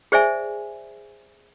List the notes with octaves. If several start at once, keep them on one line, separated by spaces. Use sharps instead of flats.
G#4 C5 D5 E5 G#5